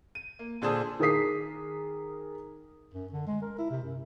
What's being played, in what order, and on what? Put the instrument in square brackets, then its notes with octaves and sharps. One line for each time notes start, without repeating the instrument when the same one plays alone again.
[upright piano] D#7
A#3
A#2 D3 G#4 C5 A5 D#6
[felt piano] D#3 G#4 A#4 D#6 B6 C7
[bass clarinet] F#2
D3
G#3
A#4
E4
C3
F#2